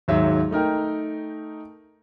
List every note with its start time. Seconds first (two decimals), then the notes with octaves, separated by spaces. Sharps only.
0.08 D#2 G#2 F#3 E5
0.51 A3 D#4 A#4 G5